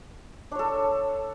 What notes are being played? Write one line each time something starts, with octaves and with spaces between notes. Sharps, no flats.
D4 A4 C#5